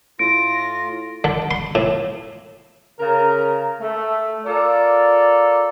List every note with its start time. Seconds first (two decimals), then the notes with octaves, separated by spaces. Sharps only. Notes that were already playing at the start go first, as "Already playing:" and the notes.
0.19 A2 F4 A#6 D7
1.24 D3
1.51 C6
1.75 A2
3.00 C#3 A#4
3.81 A3
4.46 F4 A4 A#4 D5